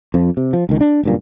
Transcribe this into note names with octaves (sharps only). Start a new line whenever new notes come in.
F2 F3
C3
F3
C#2 D#3
D4
F#1 G2 A#2